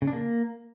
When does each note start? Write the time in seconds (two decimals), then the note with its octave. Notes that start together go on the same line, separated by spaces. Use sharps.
0.02 C#3
0.07 D4
0.13 A#3